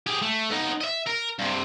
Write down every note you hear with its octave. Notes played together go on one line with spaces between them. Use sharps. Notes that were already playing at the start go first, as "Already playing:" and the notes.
G4 G#4
A3
B3 D#4
D#5 E5
A#4
G2 C3